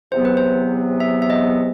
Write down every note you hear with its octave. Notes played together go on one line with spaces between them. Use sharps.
E2 C3 F#3 B3 C5
B4
C5
E5
E5
D#5